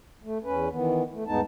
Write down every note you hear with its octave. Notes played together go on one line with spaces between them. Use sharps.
A3
E2 C#4 B4
D#3 E3 B3
A3
D2 G2 G#3 B3 D#4 A5